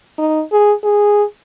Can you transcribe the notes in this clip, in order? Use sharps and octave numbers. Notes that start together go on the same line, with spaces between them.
D#4
G#4
G#4